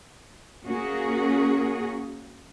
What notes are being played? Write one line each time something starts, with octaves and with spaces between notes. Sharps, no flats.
A#3 C#4 F#4 G#4 A#4